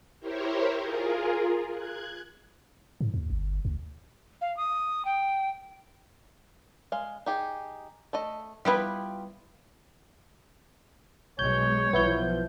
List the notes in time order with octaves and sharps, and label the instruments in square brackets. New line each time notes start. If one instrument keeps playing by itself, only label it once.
[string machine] E4 G4 A#4 C5 C#5
F4 G#4 A#4
F#6 G#6
[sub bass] G#2
D#2
G1
D2
[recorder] F5
D#6
G5
[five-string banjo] G#3 F5
D#4 G4 G#4
A3 A4 D#5
[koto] G3 B3 E4 [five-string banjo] F4 G4 B4
[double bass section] B1 G#3 [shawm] C#5 [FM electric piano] G6
[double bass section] B1 F3 [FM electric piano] B3 E4 G6